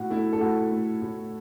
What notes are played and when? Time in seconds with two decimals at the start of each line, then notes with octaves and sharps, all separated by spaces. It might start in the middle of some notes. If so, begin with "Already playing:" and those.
Already playing: A2 F#4 F#5
0.10 A3 E4
0.33 A4
0.40 A2 F#4
0.71 A3
1.02 A2